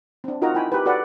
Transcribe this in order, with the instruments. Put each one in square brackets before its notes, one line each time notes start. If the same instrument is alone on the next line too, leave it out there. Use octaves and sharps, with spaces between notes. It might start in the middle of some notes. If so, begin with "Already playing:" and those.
[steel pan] C4 D4
D#4 F4 F#4 A#4 D#5 A#5
E4 G5 G#5 B5
G4 A#4 B4
F#4 A4 B4 D5 F#5